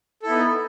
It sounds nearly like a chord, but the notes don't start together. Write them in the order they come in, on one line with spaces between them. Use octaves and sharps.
A4 E4 B3 D#4